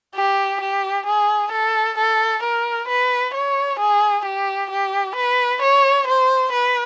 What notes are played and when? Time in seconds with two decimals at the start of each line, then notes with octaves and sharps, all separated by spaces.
0.15 G4
0.61 G4
1.06 G#4
1.52 A4
1.97 A4
2.43 A#4
2.88 B4
3.34 C#5
3.79 G#4
4.25 G4
4.70 G4
5.16 B4
5.61 C#5
6.07 C5
6.52 B4